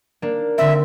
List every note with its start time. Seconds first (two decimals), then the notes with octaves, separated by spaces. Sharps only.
0.22 A#3 D4
0.58 D3 C4 E5